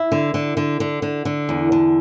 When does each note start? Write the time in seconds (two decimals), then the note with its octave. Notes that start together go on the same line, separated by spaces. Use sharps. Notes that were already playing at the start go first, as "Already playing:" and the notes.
Already playing: E4
0.12 D3
0.34 D3
0.57 D3
0.80 D3
1.02 D3
1.25 D3
1.49 E2
1.72 D3